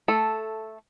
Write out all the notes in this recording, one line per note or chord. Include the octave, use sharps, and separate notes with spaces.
A3 A4